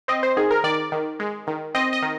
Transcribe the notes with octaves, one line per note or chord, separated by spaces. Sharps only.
C4 D#5
C5
D#3 G#4
A#4
D#3 D5
D#3
G#3
D#3
C4 D#5
D#5
D#3